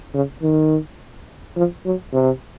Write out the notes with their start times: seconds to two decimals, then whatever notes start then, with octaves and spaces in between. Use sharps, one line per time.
0.14 C#3
0.42 D#3
1.57 F3
1.85 F#3
2.13 C3